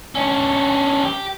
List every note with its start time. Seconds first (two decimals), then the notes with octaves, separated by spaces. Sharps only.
0.15 C#4 D4
1.03 G4